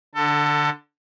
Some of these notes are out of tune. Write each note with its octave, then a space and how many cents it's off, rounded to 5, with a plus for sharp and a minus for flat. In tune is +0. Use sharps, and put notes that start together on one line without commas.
D3 +0 A4 +25